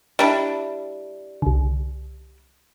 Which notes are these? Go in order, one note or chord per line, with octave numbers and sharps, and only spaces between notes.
G3 D4 E4
C2 D3